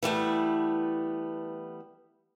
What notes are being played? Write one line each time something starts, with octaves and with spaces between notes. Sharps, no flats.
E3 G3 A3 B3